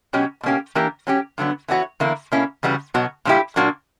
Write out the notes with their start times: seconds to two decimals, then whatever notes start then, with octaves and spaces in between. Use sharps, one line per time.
0.13 B2 F#3 C#4 G4
0.43 B2 A#3 C#4 G4
0.75 E3 A#3 D4 G4 A#4
1.07 F#3 C#4 G4
1.38 G2 D3 F#3 B3
1.68 E3 B3 D4 F#4 C#5
2.00 E2 D3 A#3 E4
2.32 B2 A#3 C#4 E4
2.63 E2 C#3 G3 B3 F#4
2.94 B2 F#3 B3 F#4
3.25 A#2 G3 C#4 E4 G4
3.56 A#2 F#3 A#3 D4 F#4